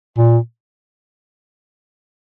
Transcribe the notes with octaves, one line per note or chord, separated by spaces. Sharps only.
A#2